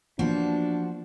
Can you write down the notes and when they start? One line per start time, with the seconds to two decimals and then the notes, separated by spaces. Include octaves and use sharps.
0.19 E3 F3 A#3 B3 D4 F#4